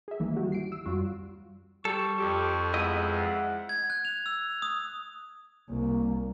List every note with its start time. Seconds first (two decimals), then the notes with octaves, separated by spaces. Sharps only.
0.08 G#4 E5
0.20 C#2 G2 D#3 E3 A#3
0.35 G3 E4 F#4 G4
0.52 C7 D7
0.72 E6
0.86 F#2 G3 F4 F#4
1.85 G3 A4 C#6
2.19 F2 G4
2.74 G#3 B3 E4 D#5
3.13 F#5
3.69 G#6
3.90 F#6
4.05 F7
4.26 E6
4.62 D#6
5.69 C2 A#3